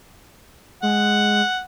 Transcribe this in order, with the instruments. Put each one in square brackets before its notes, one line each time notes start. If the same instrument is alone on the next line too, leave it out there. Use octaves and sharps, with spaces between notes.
[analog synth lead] G#3 [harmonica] F#5